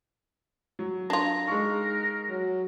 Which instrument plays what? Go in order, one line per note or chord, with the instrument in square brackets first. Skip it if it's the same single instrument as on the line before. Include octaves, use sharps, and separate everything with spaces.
[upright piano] F#3
[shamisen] D4 F4 [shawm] A#5
[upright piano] G#3 C#6 [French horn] D#4 [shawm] A#4
[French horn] F#3